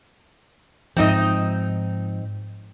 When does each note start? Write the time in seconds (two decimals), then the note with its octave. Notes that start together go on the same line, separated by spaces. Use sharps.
0.97 G#2 F3 C4 D#4 D#5